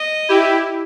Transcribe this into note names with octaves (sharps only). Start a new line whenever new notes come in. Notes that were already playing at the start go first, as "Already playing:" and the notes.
Already playing: D#5
E4 G4